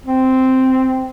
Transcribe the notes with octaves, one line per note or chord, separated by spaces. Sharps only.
C4